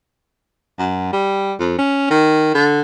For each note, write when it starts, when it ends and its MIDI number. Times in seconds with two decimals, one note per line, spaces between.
0.78 1.08 42
1.13 1.53 55
1.59 1.74 41
1.78 2.09 61
2.10 2.51 51
2.54 2.81 50